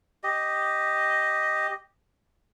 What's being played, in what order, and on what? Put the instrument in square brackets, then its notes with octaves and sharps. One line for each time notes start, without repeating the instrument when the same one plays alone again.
[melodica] G4 D#5